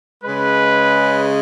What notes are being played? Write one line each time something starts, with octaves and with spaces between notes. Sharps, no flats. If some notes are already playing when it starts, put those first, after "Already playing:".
C#3 G#3 B4